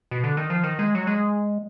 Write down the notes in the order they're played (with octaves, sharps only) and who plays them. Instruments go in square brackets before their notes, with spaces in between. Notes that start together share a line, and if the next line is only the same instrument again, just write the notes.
[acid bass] B2
D3
D#3
F3
D#3
G#3
F#3
G#3